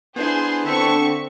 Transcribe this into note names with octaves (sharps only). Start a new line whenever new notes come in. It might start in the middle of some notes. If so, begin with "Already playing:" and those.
B3 D4 E4 G#4 C5 C6
D3 C4 E5 C#6